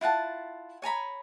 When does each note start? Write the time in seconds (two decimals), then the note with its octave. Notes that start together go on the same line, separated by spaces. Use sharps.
0.01 E4 F4 F#5 A5
0.82 C#5 G#5 A#5 B5